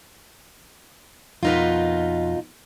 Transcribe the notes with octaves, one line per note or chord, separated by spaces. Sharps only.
F2 B2 D#4 F4 A#4 B4